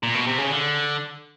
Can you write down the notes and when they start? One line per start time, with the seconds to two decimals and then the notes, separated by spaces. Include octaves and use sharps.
0.03 A#2
0.15 B2
0.27 C3
0.38 C#3
0.50 D3